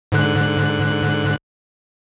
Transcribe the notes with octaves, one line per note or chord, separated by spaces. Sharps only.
G#2 D3 F#6